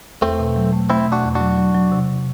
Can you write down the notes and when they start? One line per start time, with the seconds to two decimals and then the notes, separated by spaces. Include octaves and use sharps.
0.21 E2 A3 C4
0.39 B2
0.56 F#3
0.73 A3
0.90 A3 C4 E4
1.07 B2
1.12 D4 F#4
1.24 E2
1.35 D4 F#4
1.41 F#3
1.58 F#3
1.74 F#3
1.92 C3